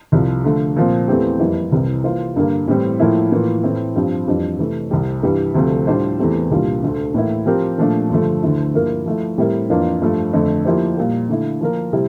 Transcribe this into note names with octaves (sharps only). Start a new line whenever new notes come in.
C2 C3 F3
D3 F3 A3
A#2 F3 C4
E2 E3 A3 C4 G4
F2 E3 G3 A#3 E4
C2 C3 E3 G3
E3 A#3 F4 C5
G2 D3 G3 A#3
A2 E3 G3 C4 G4
A2 F3 A#3 E4
A2 E3 A#3 F4
A2 E3 A3 C4 E4
G2 F3 C4 G4
F2 E3 G3 D4 F4
C3 E3 A3
C2 C3 G3
G2 E3 G3
D2 C3 F3 A3 C4
A2 G3 D4 F4 C5
E2 E3 A3 C4 G4
C2 A#2 G3 D4 F4
D2 D3 A3
A2 E3 A#3 E4
F3 C4 G4 A#4
A#2 F3 A3 D4 F4
G2 D3 F3 A3
D2 D3 A3 E4
G2 F3 A#3 E4 A#4
F3 A3 E4
A2 G3 C4 E4 A#4
F2 E3 A#3 D4 F4
G2 F3 A3
F2 D3 A3
F3 A#3 E4 G4 C5
A#2 G3 A#3
D3 A3 E4
F3 A#3 F4 A#4
C3 G3 C4 E4